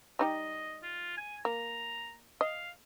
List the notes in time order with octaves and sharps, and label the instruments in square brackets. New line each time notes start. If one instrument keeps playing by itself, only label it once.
[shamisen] G3 D#4 G4 [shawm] D#5
[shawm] F4
G#5
[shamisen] A#3 [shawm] A#5
[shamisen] D#5 [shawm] F5